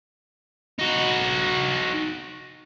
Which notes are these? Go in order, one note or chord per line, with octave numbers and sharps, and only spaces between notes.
D#4 F#4